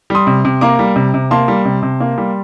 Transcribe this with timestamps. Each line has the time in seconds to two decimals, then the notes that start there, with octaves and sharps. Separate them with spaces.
0.10 G3 C6 D#6
0.27 C3
0.45 C3
0.61 A#3 A#5 D6
0.79 G3
0.96 C3
1.14 C3
1.31 A#3 A5 C6
1.48 G3
1.65 C3
1.83 C3
2.00 A#3
2.18 G3